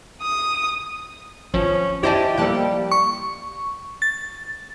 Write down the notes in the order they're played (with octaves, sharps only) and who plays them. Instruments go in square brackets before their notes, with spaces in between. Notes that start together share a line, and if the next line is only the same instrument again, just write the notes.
[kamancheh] D#6
[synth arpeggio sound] G#1 F3 [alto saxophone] C#4
[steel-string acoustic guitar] E4 D#5 A5 [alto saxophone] G4 [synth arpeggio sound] C5 D5 G#5
[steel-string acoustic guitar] F3 A#3 A5 [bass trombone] G3 [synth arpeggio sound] A4 F#6
[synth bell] C#6
A6